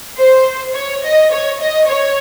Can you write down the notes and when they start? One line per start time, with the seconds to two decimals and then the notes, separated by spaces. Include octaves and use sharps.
0.17 C5
0.74 C#5
1.03 D#5
1.31 C#5
1.60 D#5
1.88 C#5